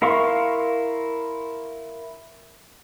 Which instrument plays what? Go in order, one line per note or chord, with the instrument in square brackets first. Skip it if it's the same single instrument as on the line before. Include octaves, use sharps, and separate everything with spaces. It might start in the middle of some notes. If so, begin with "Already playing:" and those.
[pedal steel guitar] E4 A#4 F5 C6 C#6